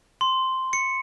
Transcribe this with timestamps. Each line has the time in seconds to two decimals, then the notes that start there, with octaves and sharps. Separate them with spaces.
0.21 C6
0.73 C#7